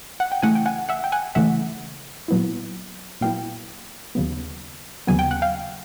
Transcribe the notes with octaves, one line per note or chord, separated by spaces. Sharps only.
F#5
G5
C#3 E3 A3 F#5 G#5
G5
F#5 G#5
E5 F#5
G5
F#5 G#5
C#3 E3 A3 E5 F#5
A#2 F#3 B3 E4
A#2 F#3 B3 E4 F5 G5
D#2 C#3 F#3 B3
D#2 C#3 F#3 B3 G#5
G5
F#5
F5 G5